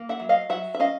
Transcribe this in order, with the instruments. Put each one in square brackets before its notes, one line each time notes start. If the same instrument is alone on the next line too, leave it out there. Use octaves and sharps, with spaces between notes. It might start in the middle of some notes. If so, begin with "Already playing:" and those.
Already playing: [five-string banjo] A#3
E5 F#5
F#3
D#5 F5
F#3 E5 F#5
E5
C#4 D#5 F5